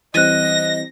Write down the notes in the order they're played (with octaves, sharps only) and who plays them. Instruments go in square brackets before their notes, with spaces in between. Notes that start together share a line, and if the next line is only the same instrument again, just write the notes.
[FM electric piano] E3 G3 C4 [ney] D#5 [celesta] F#6 D#7 [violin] A#6